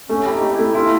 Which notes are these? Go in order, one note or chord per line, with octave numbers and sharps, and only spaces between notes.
A3 C#4
E4 G4
D#4
G4
E4
A3
E4 F4